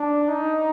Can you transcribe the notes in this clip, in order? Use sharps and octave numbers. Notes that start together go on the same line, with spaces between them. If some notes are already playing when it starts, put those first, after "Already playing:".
Already playing: D4
D#4